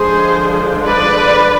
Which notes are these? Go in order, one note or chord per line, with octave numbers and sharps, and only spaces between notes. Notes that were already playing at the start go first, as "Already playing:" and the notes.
Already playing: D3 F3 G#3 D4 G#4 C5
B4 D5